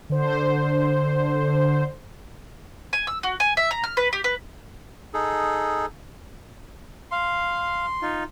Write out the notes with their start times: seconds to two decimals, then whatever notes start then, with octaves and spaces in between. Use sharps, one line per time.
0.10 D3 C5
2.93 G#5
3.07 E6
3.23 F#4
3.40 G#5
3.57 E5
3.71 A#5
3.84 F6
3.97 B4
4.13 G4
4.24 B4
5.14 D#4 G#4 A4
7.12 F5 C6
8.02 D#4 F4